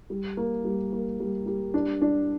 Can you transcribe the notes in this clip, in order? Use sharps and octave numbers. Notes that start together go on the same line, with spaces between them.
G3
A#3
G3
A#3
G3
G3
D4
D4